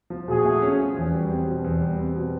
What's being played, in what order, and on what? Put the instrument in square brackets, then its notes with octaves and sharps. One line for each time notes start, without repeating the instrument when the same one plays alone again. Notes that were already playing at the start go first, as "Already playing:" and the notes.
[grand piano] F3
[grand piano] A#2 [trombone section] F#4 G#4
[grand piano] A3
C#4
F3
E2
G3
C4
B2
E2
G3
C4
B2